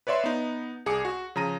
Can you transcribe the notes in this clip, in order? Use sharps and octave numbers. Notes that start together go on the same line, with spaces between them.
B4 C#5 D5 E5 C6
B3 D#4
C2 G#4 G#5 D6 C#7
F#4
C#3 F3 A#5 A#6 D#7